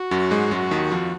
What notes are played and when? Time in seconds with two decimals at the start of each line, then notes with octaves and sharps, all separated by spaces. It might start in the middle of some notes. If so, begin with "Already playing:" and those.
Already playing: F#4
0.11 F#2 F#3
0.31 G#2 G#3
0.51 F#2 F#3
0.71 D#2 D#3
0.91 F2 F3